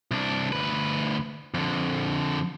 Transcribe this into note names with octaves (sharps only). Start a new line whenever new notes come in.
C2 D4
D2 B4
F2 D3